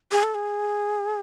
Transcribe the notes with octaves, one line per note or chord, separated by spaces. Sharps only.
G#4
A4
G#4